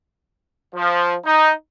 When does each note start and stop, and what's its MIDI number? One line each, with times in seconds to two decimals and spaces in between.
0.75 1.14 53
1.25 1.52 63